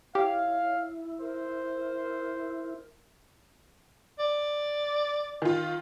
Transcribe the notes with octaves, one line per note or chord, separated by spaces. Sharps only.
E4 G4 C#5 F5
A#4 C5
D5
D#3 F4